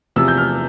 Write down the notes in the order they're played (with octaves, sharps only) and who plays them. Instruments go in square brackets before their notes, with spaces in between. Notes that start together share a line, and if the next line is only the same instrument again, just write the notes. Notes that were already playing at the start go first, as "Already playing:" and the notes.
[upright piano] E2 C3 F3 E6
G6
F6